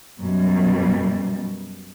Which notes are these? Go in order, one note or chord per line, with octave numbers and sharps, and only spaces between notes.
F#2 B2 G3